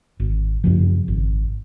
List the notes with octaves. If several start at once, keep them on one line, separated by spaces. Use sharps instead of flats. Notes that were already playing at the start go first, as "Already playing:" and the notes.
G#1
F#2 C#3 F3
G#1